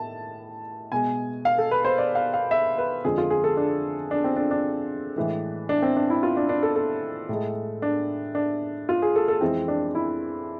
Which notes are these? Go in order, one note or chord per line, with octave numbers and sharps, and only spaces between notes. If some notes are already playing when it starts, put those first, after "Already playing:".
Already playing: A2 A5
B2 G#3 G#5
F5
A4
B4
C5
D5
F5
F5
E5
B4
F2 D3 F3 G#3 G#4
F4
G#4
A4
D4
D4
C4
D4
D4
A2 E3 G#3
D4
C4
D4
E4
F4
D4
D4
A4
A4
A2 G#3
D4
D4
F4
G#4
A4
A4
F2 E3 G#3 C4
D4
E4